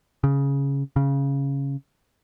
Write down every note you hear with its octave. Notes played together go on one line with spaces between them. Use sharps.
C#3
C#3